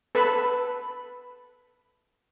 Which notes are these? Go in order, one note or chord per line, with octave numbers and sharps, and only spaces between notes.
A4 B4 A5 B5